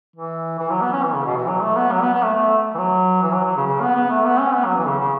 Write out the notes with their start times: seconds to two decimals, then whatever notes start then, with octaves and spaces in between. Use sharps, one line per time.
0.16 E3
0.59 E3
0.70 F#3
0.81 B3
0.93 C#4
1.03 E3
1.14 C#3
1.25 B2
1.37 E3
1.47 F#3
1.62 A3
1.76 B3
1.92 F#3
2.01 B3
2.14 B3
2.24 A3
2.35 A3
2.75 E3
2.78 F#3
3.22 E3
3.33 F#3
3.45 F#3
3.56 C#3
3.66 C#3
3.82 B3
3.96 B3
4.10 A3
4.25 B3
4.40 C#4
4.54 B3
4.65 F#3
4.77 E3
4.87 C#3
4.99 C#3